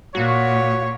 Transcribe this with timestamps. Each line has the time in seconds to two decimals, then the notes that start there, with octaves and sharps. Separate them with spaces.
0.15 A#2 F#4 C#5